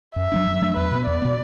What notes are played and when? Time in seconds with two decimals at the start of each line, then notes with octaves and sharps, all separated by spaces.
0.16 F#2 E5
0.32 F#3 A3 D4
0.47 F#2
0.62 F#3 A3 D4
0.77 E2 B4
0.91 B2 B3
1.06 E2 D5
1.22 B2 B3